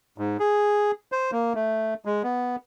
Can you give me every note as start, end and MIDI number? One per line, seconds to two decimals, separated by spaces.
0.18 0.37 44
0.40 0.91 68
1.12 1.31 72
1.32 1.53 58
1.55 1.94 57
2.05 2.22 56
2.23 2.56 59